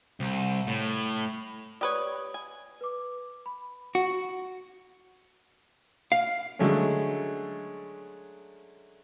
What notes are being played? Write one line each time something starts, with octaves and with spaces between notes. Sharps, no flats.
C2
A2
G4 B4 C#5 D5 D#6
G#5
B4 D6
B5
F#4
F5
D3 F#3 G#3 A3 C#4